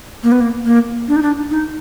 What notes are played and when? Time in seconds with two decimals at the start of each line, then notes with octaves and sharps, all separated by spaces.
0.23 A#3
0.32 B3
0.41 A#3
0.65 A#3
1.08 D4
1.16 D#4
1.22 D4
1.51 D#4